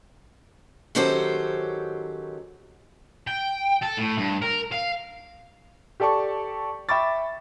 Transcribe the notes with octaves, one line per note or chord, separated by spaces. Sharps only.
D#3 F#3 C#4 G4 A4 C5
G5
A4
A2
G2
A#4
F5
G4 A4 D5 A5 C#6
E5 G5 B5 C#6 D6 A6